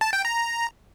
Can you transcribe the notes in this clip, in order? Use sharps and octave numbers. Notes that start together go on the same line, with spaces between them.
A5
G5
A#5